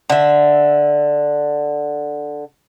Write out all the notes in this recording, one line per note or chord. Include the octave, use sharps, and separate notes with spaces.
D3 E5